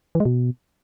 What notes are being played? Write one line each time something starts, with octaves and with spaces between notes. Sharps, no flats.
E3
G#3
B2